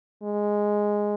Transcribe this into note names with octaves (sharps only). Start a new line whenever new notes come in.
G#3